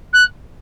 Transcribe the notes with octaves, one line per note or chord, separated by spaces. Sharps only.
F#6